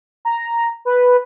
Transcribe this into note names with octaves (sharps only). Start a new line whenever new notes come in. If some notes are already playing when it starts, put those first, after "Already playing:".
A#5
B4